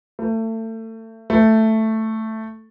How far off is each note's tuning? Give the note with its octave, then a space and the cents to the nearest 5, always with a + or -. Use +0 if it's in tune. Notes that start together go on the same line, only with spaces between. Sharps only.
A3 +30
A3 +5